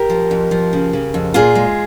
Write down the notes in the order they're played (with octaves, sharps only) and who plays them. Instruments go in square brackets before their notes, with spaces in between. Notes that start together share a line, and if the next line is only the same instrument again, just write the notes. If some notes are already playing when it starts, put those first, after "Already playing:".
Already playing: [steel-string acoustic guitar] G4 A#4
F3
F2
F3
C#3
C#3
F2
A#2 F4 G#4
G#3